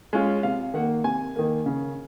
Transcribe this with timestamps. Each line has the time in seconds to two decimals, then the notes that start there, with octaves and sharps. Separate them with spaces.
0.13 G#3 C#4 F4
0.43 C3 F5
0.74 D#3 A#3 F#5
1.04 C3 G#5
1.36 D#3 A#3
1.66 C#3